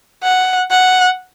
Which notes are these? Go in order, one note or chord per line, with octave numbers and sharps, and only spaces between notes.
F#5
F#5